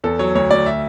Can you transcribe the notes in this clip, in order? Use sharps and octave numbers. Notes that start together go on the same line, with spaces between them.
E2 A4
F#3 C#5
D2 C#5
D2 D5
E5